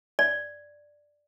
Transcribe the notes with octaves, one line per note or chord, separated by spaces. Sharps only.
D5